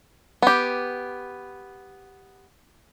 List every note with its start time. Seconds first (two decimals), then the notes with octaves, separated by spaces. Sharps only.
0.42 B3 G4